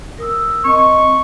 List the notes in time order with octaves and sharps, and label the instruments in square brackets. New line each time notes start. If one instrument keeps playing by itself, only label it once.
[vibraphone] A#4 D#6 E6
[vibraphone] C4 D#5 [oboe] C#6